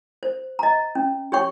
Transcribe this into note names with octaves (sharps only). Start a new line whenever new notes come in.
C5
D#5 A#5
C#4
G4 C#5 G5 C#6